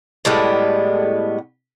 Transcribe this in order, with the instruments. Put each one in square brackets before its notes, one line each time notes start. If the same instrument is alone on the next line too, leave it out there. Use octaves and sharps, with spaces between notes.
[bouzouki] A2 G3 G#3 B3